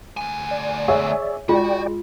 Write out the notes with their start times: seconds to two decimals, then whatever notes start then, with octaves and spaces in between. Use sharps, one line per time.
0.17 D2 G#5
0.51 D5
0.88 G#4 C#5 E5
1.49 G#3 F4 F#4 D5 G5